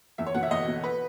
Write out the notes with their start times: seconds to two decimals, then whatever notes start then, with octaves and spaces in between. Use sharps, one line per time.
0.18 E2 E5
0.26 C#5
0.35 B2 F#5
0.43 E5
0.51 E2 D#5
0.67 B2
0.83 B4